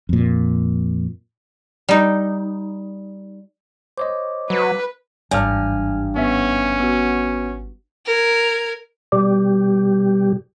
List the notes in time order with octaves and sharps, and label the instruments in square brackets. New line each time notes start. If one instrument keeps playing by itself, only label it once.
[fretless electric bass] F2 A#2
[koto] G3 D#4
[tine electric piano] C5 C#5 D#5 [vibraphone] D6
[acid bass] F#3 [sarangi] B4
[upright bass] G#1 E3 [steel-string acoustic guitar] G2 [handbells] G#5 F6
[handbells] B3 E5 [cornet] C#4
[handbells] B3 F#4
[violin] A#4 G#6
[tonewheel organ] B2 G3 G4